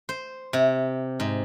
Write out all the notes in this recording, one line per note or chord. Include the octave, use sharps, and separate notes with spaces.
C5
C3
G#2